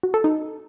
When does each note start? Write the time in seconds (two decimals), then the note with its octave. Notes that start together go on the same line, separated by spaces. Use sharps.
0.03 F#4
0.14 A4
0.24 D#4